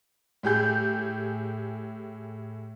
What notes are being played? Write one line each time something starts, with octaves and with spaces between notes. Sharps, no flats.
A2 G4 G#4 G6